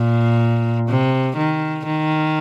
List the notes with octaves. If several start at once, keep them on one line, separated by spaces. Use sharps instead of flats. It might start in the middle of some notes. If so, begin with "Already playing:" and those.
Already playing: A#2
C3
D#3
D#3